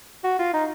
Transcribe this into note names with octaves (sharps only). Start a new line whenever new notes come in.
F#4
F4
D#4